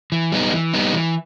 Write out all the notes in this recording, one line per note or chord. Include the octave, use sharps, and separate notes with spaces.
E3
G3 B3 D#4
E3
G3 B3 D#4
E3